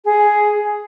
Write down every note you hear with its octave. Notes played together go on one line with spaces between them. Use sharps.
G#4